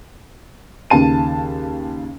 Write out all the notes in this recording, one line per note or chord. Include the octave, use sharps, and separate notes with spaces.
D#2 C#3 A5 D#7